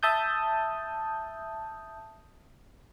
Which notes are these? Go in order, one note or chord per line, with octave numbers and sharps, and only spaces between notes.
E5 A5 D#6 G6